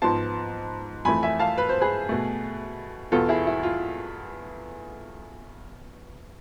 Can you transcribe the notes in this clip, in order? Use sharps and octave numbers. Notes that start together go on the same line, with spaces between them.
G#2 F3 B3 A5 C6
F2 E3 A3 G#5 B5
E5 G#5
F5 A5
B4
C5
G#4 B4
B2 A3
E2 B2 B3 F4 A4
E4 G#4
E4
F4